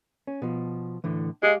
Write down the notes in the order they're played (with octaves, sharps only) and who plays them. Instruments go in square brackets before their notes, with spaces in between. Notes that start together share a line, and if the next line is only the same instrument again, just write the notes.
[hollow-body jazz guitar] C#4
B2 F3
A2 D3 E3
[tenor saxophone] G#3 [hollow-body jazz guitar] G4 F5